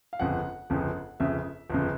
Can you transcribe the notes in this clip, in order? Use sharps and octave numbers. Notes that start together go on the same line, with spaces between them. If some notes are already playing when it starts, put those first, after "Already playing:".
F5
G1 F2 C#3 F#5
G1 F2 C#3
G1 F2 C#3 E5
G1 F2 C#3